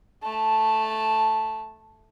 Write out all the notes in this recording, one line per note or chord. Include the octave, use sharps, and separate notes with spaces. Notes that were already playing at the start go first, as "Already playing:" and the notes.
A3 A5